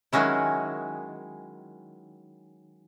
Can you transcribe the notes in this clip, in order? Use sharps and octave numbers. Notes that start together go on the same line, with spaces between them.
D#3 F#3 G#3 C#4 E4